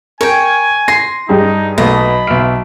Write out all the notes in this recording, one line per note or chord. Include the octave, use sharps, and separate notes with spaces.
A#4 C#5 G5 G#5
C6 A#6
G2 D#4 G4 G#4
B1 A3 B3 D#5 B5
B1 E5 F6 D7